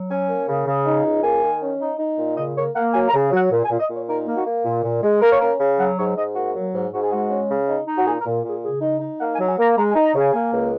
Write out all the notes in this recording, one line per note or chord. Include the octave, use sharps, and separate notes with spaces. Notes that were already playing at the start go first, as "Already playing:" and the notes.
Already playing: F#3
C#4 G#5
A#3
C#3
C#3
D#4
C#2
A#3 G#5
D#3
C#4
D#4
D#4
A#2
C#3 D#5
A#3 C#5
A#3 F#5
F#3 G#5
A#5
C#3
F#3 F#5
A#2
G#5
A#2
D#5
A#2
C#5
D#4 A#4
A#3
F#4
A#3
A#2
A#2
G#3
A#3 A#4
C#5
C#4 A#4
C#3
F#3 F#5
G#2 C#5
G#2 D#5
A#3 F#4
F#3
G#2
G#2 F#4
G#4
G#3 F#4
C#4
C#3
D#4
D#4
F#4
A#2 G#4
A#4
A#2
A#2 G#4
C#3 G#4
D#4
D#4
A#3 F#5
G#5
F#3
G#5
A#3 A#5
G#3 A#5
G#5
D#4
A#5
C#3 G#5
A#3 G#5
C#2